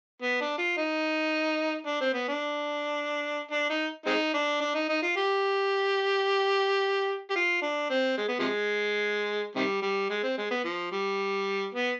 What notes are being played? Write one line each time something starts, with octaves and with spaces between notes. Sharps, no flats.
B3
D4
F4
D#4
D4
C4
B3
D4
D4
D#4
G#3 C4 D#4
D4
D4
D#4
D#4
F4
G4
G4
F4
D4
C4
G#3
B3
C3 F3 G#3
C3 D#3 G3
G3
G#3
C4
G#3
B3
F3
G3
B3